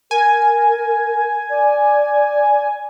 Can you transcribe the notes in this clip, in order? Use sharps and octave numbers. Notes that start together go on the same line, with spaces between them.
A#4 G#5
D5